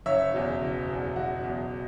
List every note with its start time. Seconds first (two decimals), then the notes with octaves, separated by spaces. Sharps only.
0.06 F#1 C#5 E5
0.34 E2 B2
0.61 F#1
0.88 E2 B2
1.16 F#1 F#4
1.43 E2 B2